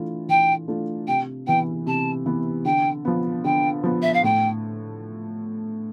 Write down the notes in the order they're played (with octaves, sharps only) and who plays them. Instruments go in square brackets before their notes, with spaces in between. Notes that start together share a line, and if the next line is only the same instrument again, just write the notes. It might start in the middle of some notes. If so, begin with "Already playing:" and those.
Already playing: [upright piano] E3 A3 D4 F4
[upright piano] E3 [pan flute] G5
[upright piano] A3 D4 F4
[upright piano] C3 [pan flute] G5
[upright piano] E3 B3 [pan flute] G5
[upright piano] C3 [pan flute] A5
[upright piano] E3 B3
[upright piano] D3 [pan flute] G5
[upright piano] F3 B3
[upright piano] D3 [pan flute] G5
[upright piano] F3 B3
[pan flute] E5
F5
[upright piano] A2 [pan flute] G5